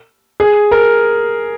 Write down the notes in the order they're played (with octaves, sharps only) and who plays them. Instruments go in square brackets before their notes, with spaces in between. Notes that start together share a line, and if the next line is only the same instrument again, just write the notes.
[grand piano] G#4
A#4